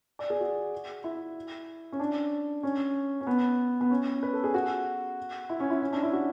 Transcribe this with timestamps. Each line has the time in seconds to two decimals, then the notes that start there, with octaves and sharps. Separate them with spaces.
0.19 D5
0.30 G#4
0.40 F#4
1.04 E4
1.92 C#4
2.00 D4
2.63 C#4
3.21 C#4
3.27 B3
3.81 B3
3.91 C#4
4.23 B4
4.33 A4
4.44 G#4
4.54 F#4
5.50 E4
5.60 C#4
5.70 E4
5.82 C#4
5.92 D4
6.03 E4
6.13 F#4